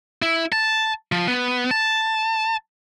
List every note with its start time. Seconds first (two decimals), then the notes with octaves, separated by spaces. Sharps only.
0.22 E4
0.52 A5
1.12 F3
1.28 B3
1.71 A5